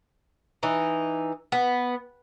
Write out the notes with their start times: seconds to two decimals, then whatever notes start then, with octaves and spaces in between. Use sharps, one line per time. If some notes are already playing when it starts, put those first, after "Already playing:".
0.63 E3 D#4
1.52 B3